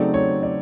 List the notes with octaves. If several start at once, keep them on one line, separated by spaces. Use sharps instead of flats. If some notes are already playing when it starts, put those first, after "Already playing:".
Already playing: C#3 F#3 A3 C4 D#4 D5
C#5
D5